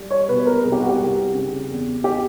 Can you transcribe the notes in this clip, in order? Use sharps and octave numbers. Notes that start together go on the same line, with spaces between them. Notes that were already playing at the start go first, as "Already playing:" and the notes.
Already playing: G3
C#5
B2 B4
A#4
C2 G#4
G4
F#4
G4
C2
C#3
E2
G4